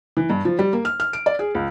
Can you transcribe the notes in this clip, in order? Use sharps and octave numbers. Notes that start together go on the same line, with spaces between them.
E3
G2
F3
G3
A#3
F6
F6
D7
D5
G#4
C#2